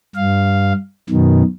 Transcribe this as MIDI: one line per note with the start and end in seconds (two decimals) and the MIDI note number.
0.15 0.73 43
0.15 0.73 77
1.09 1.43 42
1.09 1.43 47
1.09 1.43 51